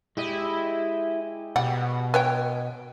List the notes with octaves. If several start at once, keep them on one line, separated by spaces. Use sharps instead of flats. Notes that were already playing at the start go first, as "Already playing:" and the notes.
G#3 E4 G4 D#5
B2 G3 F#5
B4 C#5 G5